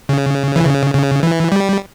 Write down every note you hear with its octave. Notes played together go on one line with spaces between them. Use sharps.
C#3
E3
C#3
C#3
E3
G3